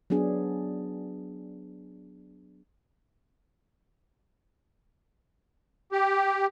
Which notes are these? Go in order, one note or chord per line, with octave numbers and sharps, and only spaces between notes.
F#3 B3 D4 G#4
G4